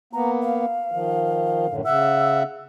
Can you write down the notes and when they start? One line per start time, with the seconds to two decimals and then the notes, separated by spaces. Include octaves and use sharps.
0.13 A#3 B3 A#5
0.42 F5
0.91 D#3 F3
1.68 F#2 A2 D3
1.85 C#3 E5 F#5 E6